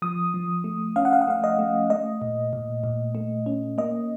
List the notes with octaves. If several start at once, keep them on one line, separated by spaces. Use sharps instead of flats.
F3 D#6
F3
A3
C#4 F5
F#5
F5
F#5
A3 F5
D#5
A3
A3 D#5
A#2
A#2
A#2
A3
C#4
A#3 D#5